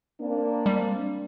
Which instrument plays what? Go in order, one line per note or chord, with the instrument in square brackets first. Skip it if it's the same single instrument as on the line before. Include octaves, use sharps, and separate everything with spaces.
[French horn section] A#3 C4 D4
[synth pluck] G3